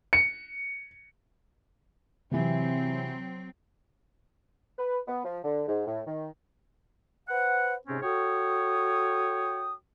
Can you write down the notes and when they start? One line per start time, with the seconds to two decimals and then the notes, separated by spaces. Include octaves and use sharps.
0.13 C#7
2.31 C3 E3 F#3 C4
4.79 B4
5.08 B3
5.25 F3
5.44 D3
5.68 G#2
5.87 A2
6.07 D#3
7.28 B4 C5 F#5
7.88 G#2 C3 C4 C#4
8.02 F#4 A4 C#5 G5 D#6